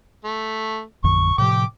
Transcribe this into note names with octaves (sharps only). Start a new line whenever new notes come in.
A3
A1 F2 D3 C#6
A2 C3 F3 G5 D6